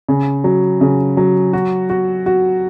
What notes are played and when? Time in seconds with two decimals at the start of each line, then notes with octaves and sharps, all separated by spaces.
0.09 C#3
0.44 F#3
0.81 C#3
1.17 F#3
1.53 F#4
1.90 F#4
2.26 F#4